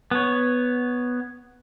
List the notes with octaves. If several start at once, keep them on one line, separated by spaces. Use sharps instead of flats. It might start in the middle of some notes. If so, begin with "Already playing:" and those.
B3 C#5